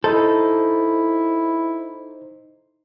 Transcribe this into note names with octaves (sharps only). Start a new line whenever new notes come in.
D#4 E4 A4 C5